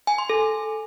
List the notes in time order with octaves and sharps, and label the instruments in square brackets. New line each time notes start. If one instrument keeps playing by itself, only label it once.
[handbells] G#5
C6
A4